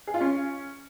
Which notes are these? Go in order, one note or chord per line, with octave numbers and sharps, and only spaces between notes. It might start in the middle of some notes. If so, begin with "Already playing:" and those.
G#4
F4
C#4